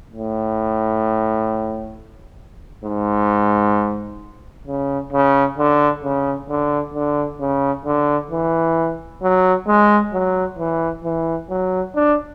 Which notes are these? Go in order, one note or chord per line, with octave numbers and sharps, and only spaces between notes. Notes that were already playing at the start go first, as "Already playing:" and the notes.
A2
G#2
C#3
C#3
D3
C#3
D3
D3
C#3
D3
E3
F#3
G#3
F#3
E3
E3
F#3
D4